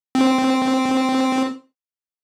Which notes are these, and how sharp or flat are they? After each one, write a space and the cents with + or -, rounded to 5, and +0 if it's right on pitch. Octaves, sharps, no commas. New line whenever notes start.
C4 -5